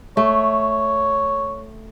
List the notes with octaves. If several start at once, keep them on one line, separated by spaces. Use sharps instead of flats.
A3 C#5